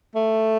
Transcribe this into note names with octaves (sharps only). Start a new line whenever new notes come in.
A3